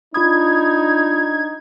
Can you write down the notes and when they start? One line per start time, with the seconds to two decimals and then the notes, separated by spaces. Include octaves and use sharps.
0.14 D4 D#4 F4 B5 D#6 G#6